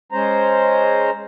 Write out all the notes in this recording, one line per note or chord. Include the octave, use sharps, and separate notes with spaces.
G#3 C#4 C5 A#5